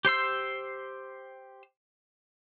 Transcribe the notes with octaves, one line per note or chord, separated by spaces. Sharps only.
G4 C5 C6 E6